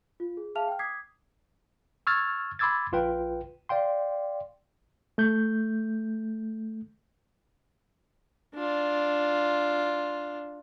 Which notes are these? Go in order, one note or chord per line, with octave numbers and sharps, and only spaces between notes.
F4
G#4
G#4 E5 F5 A5 F6 F7
G5 F6
D6 D#6 G#6 B6 C7
C#6 E6 F6 G#6 A6
B5 C6 D6 E6 G#6 A6
A#1 F4 B4 G5
D5 F5 G5 C6
A3 G6
D4 F4